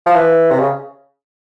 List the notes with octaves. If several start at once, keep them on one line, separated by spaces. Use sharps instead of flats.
F3
E3
C3
C#3